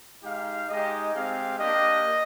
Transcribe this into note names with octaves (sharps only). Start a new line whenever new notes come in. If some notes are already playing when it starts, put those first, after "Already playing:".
G#3 D#4 G4 F5
G#3 D#4 G4 D#5
G#3 C4 G4 F5
A#3 D4 G4 D#5